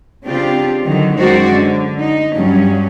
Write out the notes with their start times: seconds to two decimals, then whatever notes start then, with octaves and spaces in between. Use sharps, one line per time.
0.25 C#3 C4 D4 F4 G4
0.84 D3 D#3 F#3
1.17 F#2 D#3 G#3 F#4 C5 D5
1.52 D3
1.97 D#4
2.35 G2 F#3 G3 C#4